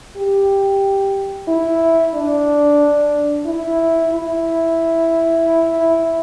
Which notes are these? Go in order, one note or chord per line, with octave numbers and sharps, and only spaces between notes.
G4
E4
D4
E4
E4